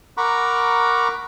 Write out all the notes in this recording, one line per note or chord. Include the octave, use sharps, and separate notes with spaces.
A#4 F#5 A#5 B5 C#6 D6